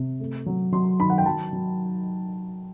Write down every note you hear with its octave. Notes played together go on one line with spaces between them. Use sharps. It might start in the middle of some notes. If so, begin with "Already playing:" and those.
Already playing: C3
A3
F#3
F#3 C6
D#3 B5
F#5
G5
F#3 A5
F#3